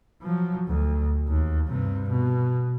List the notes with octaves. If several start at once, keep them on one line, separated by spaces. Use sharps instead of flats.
F3 F#3
D2
D#2
G2 C3
B2